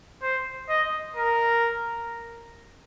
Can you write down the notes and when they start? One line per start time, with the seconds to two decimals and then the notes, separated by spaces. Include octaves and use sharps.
0.23 C5
0.69 D#5
1.17 A#4